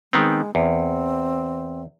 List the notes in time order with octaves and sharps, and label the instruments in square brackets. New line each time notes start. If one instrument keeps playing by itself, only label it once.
[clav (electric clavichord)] D#3 B3 C4 [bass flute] G#3
[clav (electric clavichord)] E2 [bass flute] C4